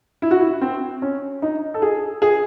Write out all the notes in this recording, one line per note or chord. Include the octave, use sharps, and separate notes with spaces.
E4
F#4
E4
C4
C#4
D#4
A4
G#4
G#4